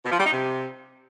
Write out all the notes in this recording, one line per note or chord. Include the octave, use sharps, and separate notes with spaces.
B2
F3
G3
D#4
C3